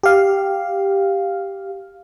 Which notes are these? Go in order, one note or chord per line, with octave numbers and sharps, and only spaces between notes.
G4 F5